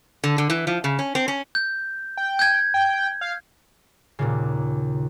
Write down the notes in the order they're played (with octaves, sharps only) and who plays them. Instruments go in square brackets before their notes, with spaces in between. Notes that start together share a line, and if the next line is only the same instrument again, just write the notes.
[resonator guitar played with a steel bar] D3
D3
E3
F3
C#3
C#4
C4
C#4
[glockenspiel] G6
[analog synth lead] G5
[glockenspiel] G6 G#6
[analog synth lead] G5
F5
[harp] D#2 A#2 C#3